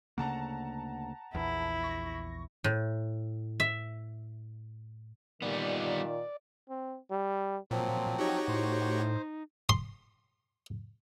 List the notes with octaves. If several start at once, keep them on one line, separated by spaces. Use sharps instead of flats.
D2 C#3 A#3 F#5 A5 A#5
A#1 E2 E4
C#6 A#6
A2
E5
A#2 D#3 G3 B3 D5
C4
G3
A#2 F3 F#3 C4
D#4 F#4 G4 C#5
A2 C5
C6